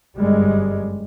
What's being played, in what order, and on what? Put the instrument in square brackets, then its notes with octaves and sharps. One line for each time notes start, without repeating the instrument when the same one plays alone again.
[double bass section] G1 F#2 G3 G#3